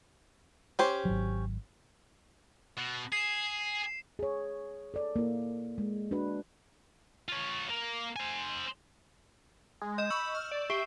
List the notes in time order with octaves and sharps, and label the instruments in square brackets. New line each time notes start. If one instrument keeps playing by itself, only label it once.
[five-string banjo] C#4 G4 C5
[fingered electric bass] G#1 F#3
[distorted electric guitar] B2
[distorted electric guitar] G#4 [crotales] C7 E7
[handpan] G#4 C#5
A4 D5
A#3 E4
G#3
D4 F#4 B4
[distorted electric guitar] F4 C#5
A#3
C5 G#5
[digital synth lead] G#3
[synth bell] D#5 [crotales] G6 E7
[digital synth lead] B5 [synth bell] C#6 [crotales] E6
[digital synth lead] F6
D5
[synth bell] G4 [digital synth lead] E5 [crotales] C#6 C7